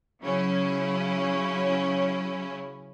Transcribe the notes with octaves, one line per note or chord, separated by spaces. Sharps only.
C#3 F#3 C#4 E4